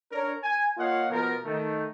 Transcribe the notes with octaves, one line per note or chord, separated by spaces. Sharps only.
D4 A#4 C#5
G#5
A#3 F4 C#5 D#5 F5 F#5
B2 F3 A#4
D#3 A3